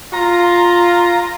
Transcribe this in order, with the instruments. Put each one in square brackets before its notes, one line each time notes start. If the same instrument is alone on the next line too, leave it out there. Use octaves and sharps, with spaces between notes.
[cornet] F4 [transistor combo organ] A#5